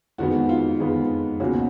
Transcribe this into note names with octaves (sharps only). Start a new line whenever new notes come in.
F2 D#3 G#3 B3 F#4
F4
F2 D#3 G#3 B3
C#2 B2 A#3 C#4 F#4